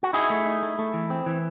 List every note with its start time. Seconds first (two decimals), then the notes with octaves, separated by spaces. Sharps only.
0.03 F#4
0.13 D#4 E4 G#4
0.30 A3
0.46 D#4
0.63 A3
0.79 A3
0.94 E3
1.10 C4
1.26 E3